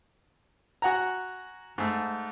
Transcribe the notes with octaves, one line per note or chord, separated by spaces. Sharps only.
F#4 F#5 G#5 A#5
G#2 A3